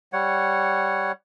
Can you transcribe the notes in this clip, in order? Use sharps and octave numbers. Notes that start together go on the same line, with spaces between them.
G3 C#5 F#5